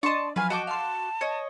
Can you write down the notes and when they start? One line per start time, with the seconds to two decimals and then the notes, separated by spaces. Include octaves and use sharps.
0.03 D4 D5 D#5 A5 C6 C#6
0.36 F3 F#3 B4 G#5 F6
0.50 F#4 D#5 G5 A5 D6
0.67 F5 A5 C6
1.21 C#5 D#5